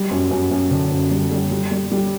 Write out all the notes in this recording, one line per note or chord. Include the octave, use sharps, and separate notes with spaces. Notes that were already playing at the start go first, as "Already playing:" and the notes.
Already playing: G3
F#2
F#2
F#2
D3
F#2
G3
G3
G3
G3
G3